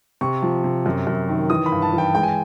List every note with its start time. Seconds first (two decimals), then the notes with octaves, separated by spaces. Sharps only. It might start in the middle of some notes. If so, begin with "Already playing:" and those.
0.21 C3 C#6
0.42 F3
0.64 C3
0.86 F#2
1.07 F#2
1.29 D#3
1.50 E3 D#6
1.66 B5
1.72 G2
1.82 A5
1.93 E3 G5
2.15 G#3 G5
2.23 G#5